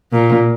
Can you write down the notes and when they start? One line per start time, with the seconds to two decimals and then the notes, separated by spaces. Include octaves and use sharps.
0.12 A#2